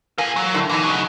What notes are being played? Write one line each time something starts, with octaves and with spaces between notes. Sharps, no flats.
A#3 A4 G#5
F#3
A2 D3
B2 E3 D#4
C#3 F#3